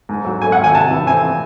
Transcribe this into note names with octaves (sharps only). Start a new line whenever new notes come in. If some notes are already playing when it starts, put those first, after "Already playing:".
G#2
F#3
A3 G#5
F#5
G#1
G#5
C3 A5
E3
C4 G#5